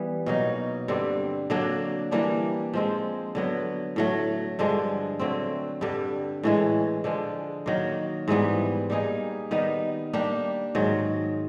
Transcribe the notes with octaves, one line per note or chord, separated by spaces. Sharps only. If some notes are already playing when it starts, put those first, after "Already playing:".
Already playing: E3 G3 B3
B2 F#3 A#3 D#4
G2 D3 G3 C4
D3 F#3 A#3 D4
E3 G3 A#3 D4
F3 G#3 C4
D3 F#3 B3
A2 F#3 A3
G2 D3 F3 G#3
D3 F#3 A3 C4
G2 D3 G3
A2 E3 G#3
D3 F3 G#3
D#3 F#3 A#3
G#2 E3 G3 B3
G3 A#3 D#4 G#4
D#3 G3 B3 D#4
G3 A#3 D4 G4
G#2 D#3 F#3